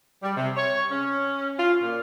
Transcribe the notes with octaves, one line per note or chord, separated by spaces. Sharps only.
G3
C3
C#5
C#4
F4
A#2